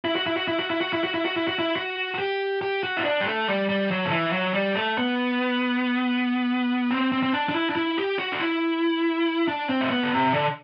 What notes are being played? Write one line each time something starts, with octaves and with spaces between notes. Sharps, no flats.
E4
F#4
E4
F#4
E4
F#4
E4
F#4
E4
F#4
E4
F#4
E4
F#4
E4
F#4
F#4
G4
G4
F#4
E4
D4
G3
A3
G3
G3
F#3
D3
E3
F#3
G3
A3
B3
C4
C4
C4
D4
D4
E4
D4
E4
G4
F#4
D4
E4
D4
C4
A3
B3
D3
C3
D3